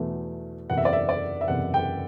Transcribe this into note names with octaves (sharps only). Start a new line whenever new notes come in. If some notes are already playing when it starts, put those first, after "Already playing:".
Already playing: E2 B2 A3
F#1 E2 C3 F#5
E5
D5
E5
D5
E5
F#1 E2 C3 F#5
G5